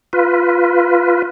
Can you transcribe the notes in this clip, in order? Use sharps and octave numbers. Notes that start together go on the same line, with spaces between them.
F4 B4